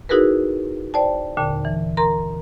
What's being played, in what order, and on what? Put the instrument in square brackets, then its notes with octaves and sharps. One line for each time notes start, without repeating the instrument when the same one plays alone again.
[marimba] D#4 E4 F#4 G#4 A#4 B4
C5 D5 G5 A5
D#2 A#2 D3 A5
E3
A#4 A#5 C6